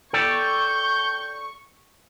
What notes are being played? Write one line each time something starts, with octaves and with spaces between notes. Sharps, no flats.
A4 D5 G5 C#6 G6